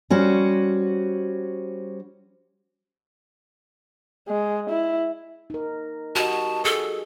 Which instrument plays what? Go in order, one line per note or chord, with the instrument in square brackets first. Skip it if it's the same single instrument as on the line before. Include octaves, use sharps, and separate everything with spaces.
[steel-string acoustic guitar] G3 C#4 F#4 C5
[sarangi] G#3
E4
[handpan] D#4 A#4
[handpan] F#4 G4 D#5 [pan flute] A5
[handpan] G#4 [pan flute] A4